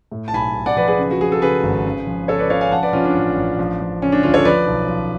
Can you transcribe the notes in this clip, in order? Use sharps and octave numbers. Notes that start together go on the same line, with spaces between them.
A2
A5
B1 G#5 B5
B1
D5 F#5
F3 B4 D5
G#4 B4
C#3
F#4
F3 G#4
A4
C#3 G#4 B4
G#1
C#3
F3
C#3 A4 C#5
B4 D5
C#3 C#5 F5
F5 G#5
F3 F#5 A5
B4 D5
F3 C#4 F4
D4
A1
A1
F3
F3
C#3 C#4
D4
D2 C#4 F4
A4 C#5
F3 B4 D5
B1
F3